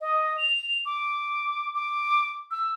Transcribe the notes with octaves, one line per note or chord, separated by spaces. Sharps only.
D#5
F7
D6
D6
E6